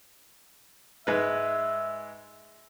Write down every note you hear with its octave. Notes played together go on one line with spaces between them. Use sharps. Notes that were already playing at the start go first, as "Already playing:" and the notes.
G#2 G#3 B4 E5